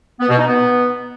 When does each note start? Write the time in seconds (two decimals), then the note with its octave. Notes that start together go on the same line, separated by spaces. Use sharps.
0.20 B3
0.29 B2
0.38 D#4
0.47 B3